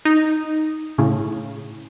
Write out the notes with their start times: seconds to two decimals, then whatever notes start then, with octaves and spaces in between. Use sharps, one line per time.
0.05 D#4
0.98 A2 C#3